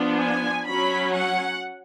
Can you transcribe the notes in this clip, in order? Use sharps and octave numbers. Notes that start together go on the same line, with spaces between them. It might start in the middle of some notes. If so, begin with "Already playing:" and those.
Already playing: F3 B3 D4
G#5
F#3 C#4 B5
F#5